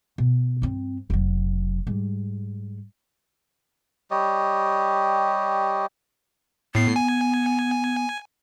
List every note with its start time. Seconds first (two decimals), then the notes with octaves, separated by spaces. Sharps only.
0.18 B2
0.62 G2 C4
1.10 F1 F#3
1.87 G#2 G3
4.11 G3 G4 C#5 D#5
6.75 A2 B3 C7
6.96 G#5